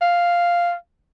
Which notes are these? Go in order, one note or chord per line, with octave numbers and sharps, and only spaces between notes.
F5